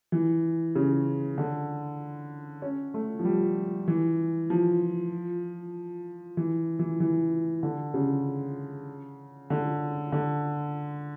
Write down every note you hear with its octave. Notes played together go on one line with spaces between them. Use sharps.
E3
C#3
D3
C#4
A3
F3
G3
E3
F3
E3
E3
E3
D3
C#3
D3
D3